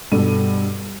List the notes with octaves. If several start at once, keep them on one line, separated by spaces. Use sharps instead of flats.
G2 B2 A4 D#7